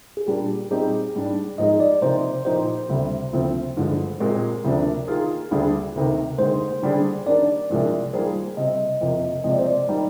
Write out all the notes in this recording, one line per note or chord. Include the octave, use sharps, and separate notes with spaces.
G#4
A#2 G3 A#3 D4 G4
A#2 G3 C4 D#4 G4 G#4
G#2 G3 D4
G#2 F3 G#3 D#4 G#4 D#5
D5
C3 F3 A#3 D#4 C5
A#2 F3 A#3 D#4 G4 C5
D2 C3 G3
D2 C3 F3 C4
G2 D3 F3 G#3
A#2 G#3 C4 G4 A#4
D2 C3 F3 A#3 D4
D#3 A#3 F4 G#4
D2 D3 G3 D4 G#4
D2 C3 D#3
D#2 D3 G#3 C5
D3 G3 D4 G#4
D#3 A#3 D4 G4 D5
C2 C3 F3 G#3 D4
D#3 G3 A#3 F4 G#4 C5
C3 G3 C4 D#5
F2 C3 F3 A#3
C3 F3 G#3 C4 D#5
D5
C5
D5
D#3 G3 A#3 D#4